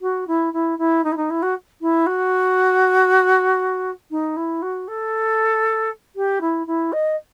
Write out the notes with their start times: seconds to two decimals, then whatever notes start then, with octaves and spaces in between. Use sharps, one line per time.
0.01 F#4
0.27 E4
0.53 E4
0.78 E4
1.04 D#4
1.12 E4
1.17 D#4
1.30 E4
1.42 F#4
1.81 E4
2.06 F#4
4.11 D#4
4.37 E4
4.62 F#4
4.88 A4
6.16 G4
6.41 E4
6.67 E4
6.93 D#5